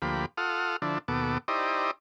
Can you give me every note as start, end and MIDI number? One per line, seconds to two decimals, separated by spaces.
0.02 0.26 38
0.02 0.26 53
0.02 0.26 58
0.02 0.26 67
0.02 0.26 83
0.37 0.76 65
0.37 0.76 69
0.37 0.76 78
0.37 0.76 87
0.37 0.76 89
0.82 0.98 50
0.82 0.98 53
0.82 0.98 62
0.82 0.98 64
1.08 1.38 39
1.08 1.38 47
1.08 1.38 59
1.08 1.38 69
1.08 1.38 86
1.48 1.91 63
1.48 1.91 64
1.48 1.91 67
1.48 1.91 72
1.48 1.91 74
1.48 1.91 75